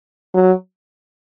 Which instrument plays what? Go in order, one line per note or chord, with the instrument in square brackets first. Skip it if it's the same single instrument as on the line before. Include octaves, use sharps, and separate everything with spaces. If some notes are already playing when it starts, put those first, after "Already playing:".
[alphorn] F#3